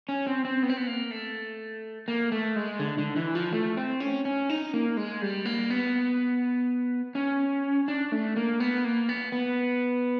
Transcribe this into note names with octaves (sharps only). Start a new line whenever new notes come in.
C#4
C4
C4
B3
C4
B3
A#3
A3
A#3
A3
G#3
D3
D3
E3
F3
A3
C4
C#4
C#4
D#4
A#3
G#3
G3
A#3
B3
C#4
D4
A3
A#3
B3
A#3
B3
B3